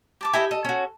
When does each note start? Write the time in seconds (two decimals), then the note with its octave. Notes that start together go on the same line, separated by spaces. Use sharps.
0.21 G4 A5 D6
0.33 E4 G4 A4 D#5 G#5
0.51 A4 D#5
0.65 C#4 F#4